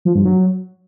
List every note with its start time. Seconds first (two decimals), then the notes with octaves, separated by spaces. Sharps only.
0.05 F3
0.15 G2
0.25 F#3